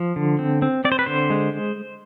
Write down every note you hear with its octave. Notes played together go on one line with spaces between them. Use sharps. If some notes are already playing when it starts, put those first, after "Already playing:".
Already playing: F3
D3
C4
C4
C4 D5
C5
B4
D3 C5
G#3